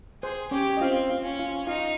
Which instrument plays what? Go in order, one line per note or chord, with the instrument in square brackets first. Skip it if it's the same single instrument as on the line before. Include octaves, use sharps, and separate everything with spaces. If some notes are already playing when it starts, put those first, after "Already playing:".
[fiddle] G#4 [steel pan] C5
[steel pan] C#4 C#5 [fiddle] G4
[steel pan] D#5
[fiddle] C4 [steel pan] F4 F5
[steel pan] F4 F5
[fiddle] C#4
[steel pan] F4 F5
[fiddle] D#4 [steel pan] F4 F5